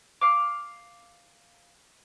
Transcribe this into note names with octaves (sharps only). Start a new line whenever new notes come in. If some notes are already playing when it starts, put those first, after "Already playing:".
F5 D6